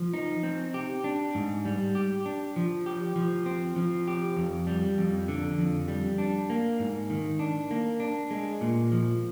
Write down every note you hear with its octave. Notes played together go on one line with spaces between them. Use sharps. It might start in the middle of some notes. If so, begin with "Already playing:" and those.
Already playing: F3
D#4
C4
G4
D4
G#2
G3
G4
D4
F3
G4
F3
C4
F3
G4
F2
G3
F2
D3
F2
G3
D4
A#3
G#2
D#3
D4
A#3
D4
G#3
A#2
F3